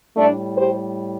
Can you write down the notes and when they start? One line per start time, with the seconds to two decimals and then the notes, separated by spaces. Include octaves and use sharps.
0.17 A2 G3 A3 D4
0.56 G4 C5